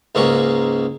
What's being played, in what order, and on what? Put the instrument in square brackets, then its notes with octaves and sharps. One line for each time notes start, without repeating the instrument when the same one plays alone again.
[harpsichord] C#2 G#2 A#3 C#4 C#6